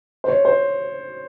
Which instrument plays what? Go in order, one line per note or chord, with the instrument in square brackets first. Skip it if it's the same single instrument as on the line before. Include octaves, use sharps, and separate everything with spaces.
[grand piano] C5
C#5
C5